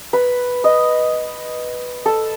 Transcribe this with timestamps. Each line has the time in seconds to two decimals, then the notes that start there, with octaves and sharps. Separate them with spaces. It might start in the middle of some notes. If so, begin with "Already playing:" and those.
0.13 B4
0.64 D#5
2.06 A4